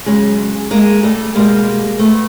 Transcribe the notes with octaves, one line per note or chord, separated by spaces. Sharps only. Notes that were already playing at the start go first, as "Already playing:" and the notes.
C#3 F#3 G#3
G#3 A#3
G3 A3
B2 G3 G#3 A#3
A3 B3